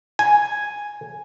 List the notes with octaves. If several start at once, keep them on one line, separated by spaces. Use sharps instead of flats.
G#5